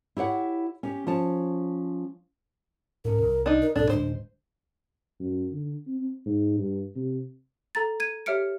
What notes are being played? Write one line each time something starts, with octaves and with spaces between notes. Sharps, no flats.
E4 G4 C#5 F#5
C#4 G4
F3 C#4 A5
G#2 C#4 A#4
C2
D4 D#4
A#4
B1 G#2 D4 A4
D1 D2 G#3 D4 C5
F#2
D3
C4
G#2
G2
C3
A4 A#5 A6
G#6 D#7
G4 C#5 E5 F6 C#7 D7